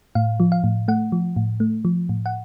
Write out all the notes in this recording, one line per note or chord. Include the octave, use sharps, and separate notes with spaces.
A2 F5
F3
F5
A2
A3 F#5
F3
A2
A3
F3
A2
F#5